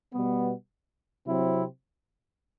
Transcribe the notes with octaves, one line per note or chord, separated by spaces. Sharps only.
B2 G3 B3
C3 F#3 C4 E4